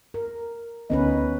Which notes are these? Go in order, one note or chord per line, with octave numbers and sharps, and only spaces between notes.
A#4
D2 D3 B3 C#4 D#4 B4